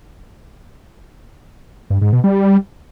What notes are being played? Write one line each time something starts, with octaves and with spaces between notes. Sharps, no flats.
G2
G#2
B2
G3